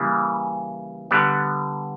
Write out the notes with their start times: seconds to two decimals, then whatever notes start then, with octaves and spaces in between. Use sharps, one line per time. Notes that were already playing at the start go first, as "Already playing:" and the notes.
Already playing: C#3 E3 G3 A#3
1.11 D3 G3 B3